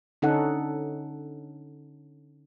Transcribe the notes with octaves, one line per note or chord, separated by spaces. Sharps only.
D3 C#4 D#4 A4 F#5